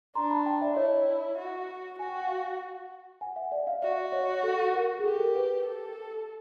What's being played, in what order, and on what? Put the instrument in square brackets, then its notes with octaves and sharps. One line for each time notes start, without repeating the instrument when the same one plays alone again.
[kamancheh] D4 [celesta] A#5 C6
[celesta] A5 B5
G5 A5
D5 E5
[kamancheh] E4 [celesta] C#5 D#5
[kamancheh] F#4
[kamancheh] F#4 [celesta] G#5
[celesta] G5
F#5
F5 G5
F#5 G#5
E5 F#5
D5 E5
D#5 F5
[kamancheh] F#4 [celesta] D5 E5
[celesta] C#5 D#5
A4
A#4
G#4
[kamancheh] G4 [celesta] A4
[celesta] A#4
B4
A#4
[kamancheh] A4